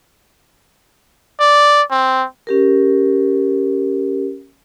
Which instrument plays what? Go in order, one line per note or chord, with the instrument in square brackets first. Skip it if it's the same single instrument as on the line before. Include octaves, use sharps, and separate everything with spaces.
[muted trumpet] D5
C4
[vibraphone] C#4 G4 A#4